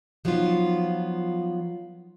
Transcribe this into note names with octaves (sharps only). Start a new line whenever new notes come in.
F3 F#3 B3 D#4 F4